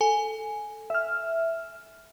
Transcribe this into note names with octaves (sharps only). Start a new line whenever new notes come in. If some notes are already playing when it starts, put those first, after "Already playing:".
A4 G#5
E5 F6